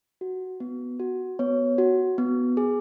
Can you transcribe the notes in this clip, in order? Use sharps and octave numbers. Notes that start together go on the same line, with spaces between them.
F#4
B3
F#4
B3 C#5
F#4
B3
G#4